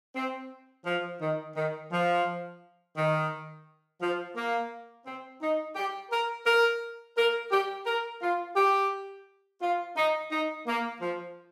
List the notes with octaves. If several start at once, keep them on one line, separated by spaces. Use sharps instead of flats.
C4
F3
D#3
D#3
F3
D#3
F3
A#3
C4
D#4
G4
A#4
A#4
A#4
G4
A#4
F4
G4
F4
D#4
D#4
A#3
F3